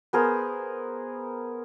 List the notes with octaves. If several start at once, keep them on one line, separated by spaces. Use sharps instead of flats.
B3 G#4 A#4 C5